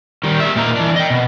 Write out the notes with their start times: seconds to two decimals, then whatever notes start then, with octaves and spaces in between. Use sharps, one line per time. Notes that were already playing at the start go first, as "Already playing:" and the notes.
0.23 D#3 G3
0.40 G#4 E5
0.56 A#2 A#3 D#4 A#5
0.76 E3 D4
0.96 D#5 G5
1.10 B2